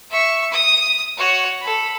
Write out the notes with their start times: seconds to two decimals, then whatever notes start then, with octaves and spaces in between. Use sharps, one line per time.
0.10 E5 C#6
0.51 D#6
1.17 F#4 C#5
1.61 A4 B5